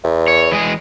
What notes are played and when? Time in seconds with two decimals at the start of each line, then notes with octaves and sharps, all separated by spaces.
0.04 E2
0.28 C#5
0.51 E3 G#3 G#4